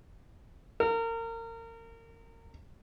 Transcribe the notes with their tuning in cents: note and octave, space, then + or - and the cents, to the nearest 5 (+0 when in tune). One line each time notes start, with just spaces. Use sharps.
A#4 -30